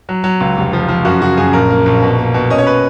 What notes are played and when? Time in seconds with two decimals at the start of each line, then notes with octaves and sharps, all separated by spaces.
0.09 F#3
0.24 F#3
0.41 C#2
0.57 F1
0.73 F3
0.89 F3
1.05 F#2 F#4
1.21 C#3 F#4
1.37 F#2 G#4
1.53 A#1 A#4
1.70 A#3
1.86 A#1
2.02 B2
2.19 A#3
2.34 B2
2.50 C#4 D#5
2.59 C#5
2.67 B4